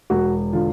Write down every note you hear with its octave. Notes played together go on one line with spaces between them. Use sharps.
E1 F#4
D3 F4